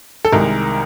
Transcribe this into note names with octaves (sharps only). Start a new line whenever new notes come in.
A4
C2 C3 D#3 G#3 A#4